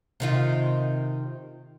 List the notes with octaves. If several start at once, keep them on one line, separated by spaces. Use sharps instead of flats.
C3 D#3 F4